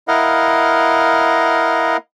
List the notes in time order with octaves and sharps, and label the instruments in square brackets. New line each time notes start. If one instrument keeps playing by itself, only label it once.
[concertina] E4 A#4 D#5 F5 F#5